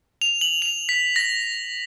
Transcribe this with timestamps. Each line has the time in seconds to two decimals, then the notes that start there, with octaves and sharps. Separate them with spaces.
0.22 F7
0.41 F#7
0.62 F7
0.89 B6
1.16 A#6